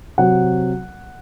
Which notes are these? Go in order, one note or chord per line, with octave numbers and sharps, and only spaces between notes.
C3 F#3 C4 F#5